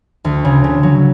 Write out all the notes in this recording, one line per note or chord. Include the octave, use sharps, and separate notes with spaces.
D2
C#3
C#3
F#3